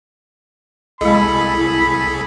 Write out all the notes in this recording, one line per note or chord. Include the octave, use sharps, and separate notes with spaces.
C2 G#3 E4 G#4 A4 D#5 B5